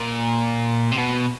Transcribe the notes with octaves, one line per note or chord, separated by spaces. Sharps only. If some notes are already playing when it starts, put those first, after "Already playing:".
Already playing: A#2
C3
B2